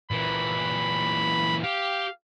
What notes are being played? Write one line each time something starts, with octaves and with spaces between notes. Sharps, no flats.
A#2 E3 B5
G4 F5